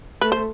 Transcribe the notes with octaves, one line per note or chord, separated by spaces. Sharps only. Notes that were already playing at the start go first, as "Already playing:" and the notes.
A3 B4
C5